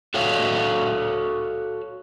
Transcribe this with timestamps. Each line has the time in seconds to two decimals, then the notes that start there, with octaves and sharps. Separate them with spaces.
0.14 F#4 A4 C#5 F5